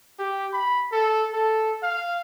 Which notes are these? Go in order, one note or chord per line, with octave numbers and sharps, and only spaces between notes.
G4
B5
A4
A4
F5